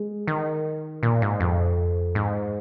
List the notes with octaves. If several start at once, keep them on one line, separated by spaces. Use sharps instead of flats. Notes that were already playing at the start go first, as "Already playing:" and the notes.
Already playing: G#3
D#3
A#2
G#2
F2
G#2